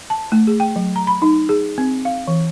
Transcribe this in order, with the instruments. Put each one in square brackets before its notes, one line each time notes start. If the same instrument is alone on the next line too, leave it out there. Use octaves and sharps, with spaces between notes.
[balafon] A5
A3
G#4
G5
F#3
A#5
B5
D#4
G#4
C4
F5
E3